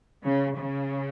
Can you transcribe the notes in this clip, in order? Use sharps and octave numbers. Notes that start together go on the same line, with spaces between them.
C#3
C#3